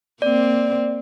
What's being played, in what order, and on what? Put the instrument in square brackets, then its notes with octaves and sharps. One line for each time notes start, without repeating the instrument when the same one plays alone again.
[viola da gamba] A#3 C4 [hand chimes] D5